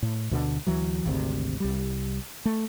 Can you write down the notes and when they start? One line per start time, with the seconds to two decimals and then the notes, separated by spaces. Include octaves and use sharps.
0.02 A2
0.31 D2 B2 D3
0.67 D2 E3 F#3
1.05 G#1 D2 C3
1.60 C2 G3
2.45 A3